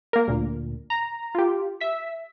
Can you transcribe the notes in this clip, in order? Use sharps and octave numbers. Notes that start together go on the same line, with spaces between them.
A#3 A#4
D2 A#2
A#5
F4 G4
E5 B6